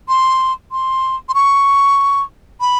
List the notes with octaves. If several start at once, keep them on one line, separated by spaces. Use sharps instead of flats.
C6
C6
C6
C#6
B5